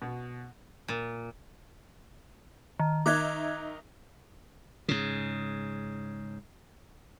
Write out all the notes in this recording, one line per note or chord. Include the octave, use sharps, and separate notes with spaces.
B2
A#2
D#3
D#3 D#4 E5 D6 F#6 G#6
G#2 C#3